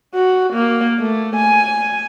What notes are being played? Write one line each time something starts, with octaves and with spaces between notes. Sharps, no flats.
F#4
A#3
A3
G#5